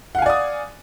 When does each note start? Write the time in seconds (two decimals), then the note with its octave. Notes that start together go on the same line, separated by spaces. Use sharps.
0.15 F#5
0.18 F5
0.22 G#5
0.26 D5
0.30 D#6